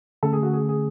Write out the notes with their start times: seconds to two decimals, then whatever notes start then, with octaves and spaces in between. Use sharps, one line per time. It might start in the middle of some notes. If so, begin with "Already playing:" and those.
0.23 D3 A3 C#4 A4
0.33 G#4
0.43 F#4
0.53 G#4
0.69 G#4